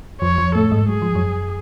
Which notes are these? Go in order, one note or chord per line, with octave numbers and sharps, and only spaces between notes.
F2 F3 C#5
F2 F3
A2 A3 A4
G#2 G#3
F#3 G#4
F3
F#2 F#3